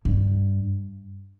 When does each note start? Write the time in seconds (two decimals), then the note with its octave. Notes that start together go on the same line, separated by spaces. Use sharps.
0.05 G2